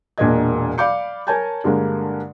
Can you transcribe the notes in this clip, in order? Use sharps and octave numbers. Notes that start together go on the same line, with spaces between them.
E1 A#2 D4 A#4 D#5 G#6
D5 F5 B5 D6 G6 C#7
A#4 C#5 G#5 A5 G6 G#6
G2 D3 G#3 A#3